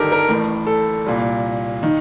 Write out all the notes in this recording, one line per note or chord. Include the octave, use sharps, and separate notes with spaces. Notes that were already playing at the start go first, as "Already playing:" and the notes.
Already playing: G1 G2 D#3 G4 A4 A#4
A#4
A1 A2
A4
C2 A#2
D#3